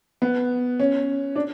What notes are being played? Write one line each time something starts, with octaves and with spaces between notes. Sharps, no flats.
B3
C#4
D4